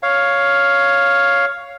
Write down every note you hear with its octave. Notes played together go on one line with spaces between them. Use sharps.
C#5 F5